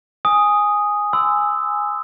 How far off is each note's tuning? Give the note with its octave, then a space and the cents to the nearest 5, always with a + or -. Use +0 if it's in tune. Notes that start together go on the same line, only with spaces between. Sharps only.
G#5 -5 D#6 +0
G#5 +0 C6 -35 E6 -5